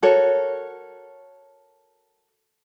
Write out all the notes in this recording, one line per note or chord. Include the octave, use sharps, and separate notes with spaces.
F#4 A4 A#4 C#5